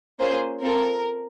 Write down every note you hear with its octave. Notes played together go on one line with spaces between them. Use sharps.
A#3 C#4 F4 G#4 C5
C4 F4 A4 A#4